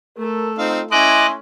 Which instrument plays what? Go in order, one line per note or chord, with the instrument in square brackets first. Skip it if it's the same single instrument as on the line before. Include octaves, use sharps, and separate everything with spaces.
[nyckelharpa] A3 A4 [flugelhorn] A#4
[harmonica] C4 D#4 F5 [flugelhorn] F4
[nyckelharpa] C#4 [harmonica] E4 C6 [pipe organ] D#5 D6 F#6 [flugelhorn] G#5